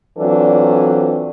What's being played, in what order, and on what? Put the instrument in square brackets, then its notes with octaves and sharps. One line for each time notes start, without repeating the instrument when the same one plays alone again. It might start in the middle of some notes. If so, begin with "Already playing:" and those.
[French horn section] E3 F#3 C4 D4 F4 A4